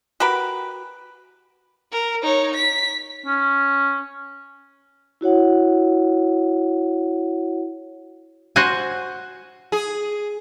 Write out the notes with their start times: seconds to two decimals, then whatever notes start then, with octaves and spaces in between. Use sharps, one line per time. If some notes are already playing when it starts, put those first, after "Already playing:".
0.20 F#4 G4 A#4 B4
1.92 A#4
2.22 D#4 C#5
2.54 B6
3.26 C#4
5.21 E4 F#4 C#5 F#5
8.56 F#4 C5 F#5 G#5
9.72 G#4